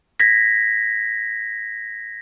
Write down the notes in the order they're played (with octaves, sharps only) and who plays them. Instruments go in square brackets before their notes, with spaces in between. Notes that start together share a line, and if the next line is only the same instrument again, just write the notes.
[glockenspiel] G#6 A#6 B6